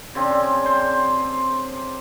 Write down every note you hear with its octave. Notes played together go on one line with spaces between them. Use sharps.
C#3 C4 D4
C5